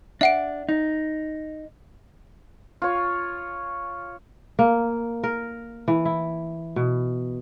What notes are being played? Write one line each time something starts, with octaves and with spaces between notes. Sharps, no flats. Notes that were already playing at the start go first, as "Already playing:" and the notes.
D4 E5 F#5 D7
D#4
F4 C#5
A#3
A#4
E3
E4
B2